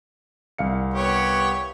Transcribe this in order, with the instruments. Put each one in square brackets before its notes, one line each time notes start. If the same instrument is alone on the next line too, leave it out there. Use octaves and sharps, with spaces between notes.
[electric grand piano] C2 F5 C#7
[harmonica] B3 G4 C#5